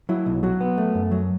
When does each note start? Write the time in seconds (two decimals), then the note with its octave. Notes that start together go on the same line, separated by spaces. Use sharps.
0.09 F#3 E4
0.26 B1
0.43 F#3 F#4
0.61 B3
0.78 A3
0.95 F#2
1.11 F#3